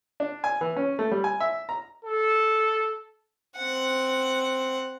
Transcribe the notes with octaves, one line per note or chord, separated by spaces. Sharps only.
D4
G#5
E3
C#4
A3
G3
G#5
E5
A#5
A4
C4 F#5